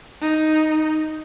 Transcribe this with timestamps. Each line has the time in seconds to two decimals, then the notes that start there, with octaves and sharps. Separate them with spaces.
0.21 D#4